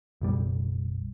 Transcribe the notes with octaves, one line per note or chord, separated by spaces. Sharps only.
F#1 B1 G3